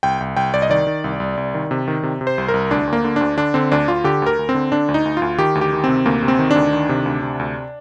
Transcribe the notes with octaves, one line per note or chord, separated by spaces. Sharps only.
C2 G5
C2
C2 G5
C2 D5
D#5
D#3 D5
D#3
C2
C2
C2
D#3
C3
D#3
C3
C3
C5
C2
A#4
C2
D2 D4
D2
A#3
D3
D2 D4
D3 D4
D3 C4
D2 D4
D2 F4
D3 G4
D2 A#4
D2
C4
D3
D3 D4
D2
D#4
D2
D2 F4
D#3 G4
D2
G4
D#3
C3 C4
D2 A#3
C3
C4
D#3
D4
D2
D#3
C3
D2
C3
D2